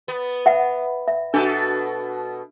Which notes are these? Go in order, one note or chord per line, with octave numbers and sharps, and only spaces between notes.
B3
E5 F#5
E5
B2 D4 F#4 A4